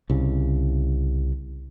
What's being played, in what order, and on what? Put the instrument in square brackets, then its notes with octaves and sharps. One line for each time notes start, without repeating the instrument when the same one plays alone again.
[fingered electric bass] C2 C#3